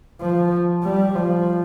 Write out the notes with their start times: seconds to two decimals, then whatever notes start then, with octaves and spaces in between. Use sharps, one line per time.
0.21 F3
0.84 G3
1.15 F3